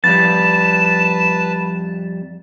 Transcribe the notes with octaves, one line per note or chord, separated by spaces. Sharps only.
F2 G3 B4 A5 A6 E7